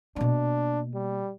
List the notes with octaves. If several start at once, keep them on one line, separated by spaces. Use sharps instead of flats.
B2 A#3 D4
G3